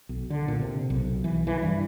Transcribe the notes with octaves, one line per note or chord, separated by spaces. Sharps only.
B1
D3
A#2
C3
B1
E3
E3
G2